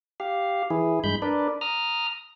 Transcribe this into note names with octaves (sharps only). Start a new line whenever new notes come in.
G4 F5
E3 E4 G#4
G2 G#3 B5 G6
D4 A#4 B4 D5
A#5 D#6 F6